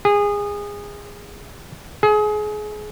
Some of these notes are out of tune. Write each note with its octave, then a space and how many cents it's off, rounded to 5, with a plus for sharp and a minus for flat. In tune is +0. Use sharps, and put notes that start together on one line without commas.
G#4 -25
G#4 +25